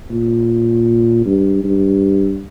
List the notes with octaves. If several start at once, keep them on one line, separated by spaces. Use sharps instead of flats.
A#2
G2
G2